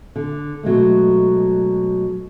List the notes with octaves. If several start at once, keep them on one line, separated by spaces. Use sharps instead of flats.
D3
B2 F#3 G#3 A3